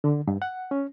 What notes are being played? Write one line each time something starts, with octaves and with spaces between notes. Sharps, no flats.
D3
G2
F#5
C#4